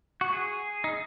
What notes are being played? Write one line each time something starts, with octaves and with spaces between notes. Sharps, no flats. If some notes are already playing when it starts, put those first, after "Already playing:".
F#4
G#4
D#4